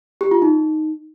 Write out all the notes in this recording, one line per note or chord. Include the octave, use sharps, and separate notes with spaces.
G4
F4
D#4